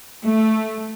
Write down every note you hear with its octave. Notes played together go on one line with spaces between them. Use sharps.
A3